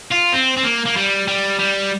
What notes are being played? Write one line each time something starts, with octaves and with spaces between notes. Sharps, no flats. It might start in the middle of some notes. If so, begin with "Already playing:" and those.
F4
C4
C4
A#3
A#3
G3
G3
G3